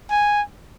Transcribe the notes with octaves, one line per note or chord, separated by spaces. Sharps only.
G#5